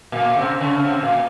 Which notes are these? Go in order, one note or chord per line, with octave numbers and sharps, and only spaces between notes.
A#2 A#3
C3 C4
C#3 C#4
C3 C4
A#2 A#3